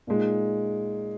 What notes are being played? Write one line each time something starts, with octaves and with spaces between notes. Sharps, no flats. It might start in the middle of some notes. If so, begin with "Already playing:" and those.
A#2 G#3 D#4